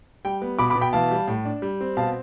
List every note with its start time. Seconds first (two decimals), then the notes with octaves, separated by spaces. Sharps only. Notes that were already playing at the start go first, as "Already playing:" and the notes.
0.25 G3 G5
0.42 B3
0.59 B2 B5 D6
0.70 B5 D6
0.76 B2
0.81 G5 B5
0.93 E3 F5 A5
1.11 G3
1.27 A2
1.45 D4
1.62 G3
1.81 C4
1.97 B2 F5 A5